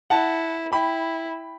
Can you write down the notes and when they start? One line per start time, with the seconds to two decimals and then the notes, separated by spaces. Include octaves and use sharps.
0.10 E4 F#5 A5
0.72 E4 G5 B5